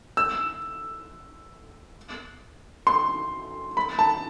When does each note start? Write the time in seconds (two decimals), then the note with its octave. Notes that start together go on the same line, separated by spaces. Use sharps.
0.17 E6
2.87 C6
3.77 B5
3.99 A5